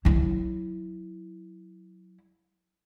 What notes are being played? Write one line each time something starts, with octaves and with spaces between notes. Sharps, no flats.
F#3 E4